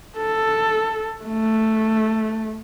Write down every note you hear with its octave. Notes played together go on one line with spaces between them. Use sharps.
A4
A3